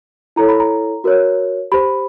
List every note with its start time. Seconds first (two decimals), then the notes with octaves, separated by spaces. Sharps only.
0.36 E4 A4 C#5 A#5
0.49 B5
0.60 A#5
1.04 F#4 A#4 C#5
1.72 G4 C5 B5